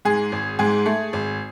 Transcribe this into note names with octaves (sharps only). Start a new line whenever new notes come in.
G#2 G#4
G#1
G#2 G#4
A3
G#1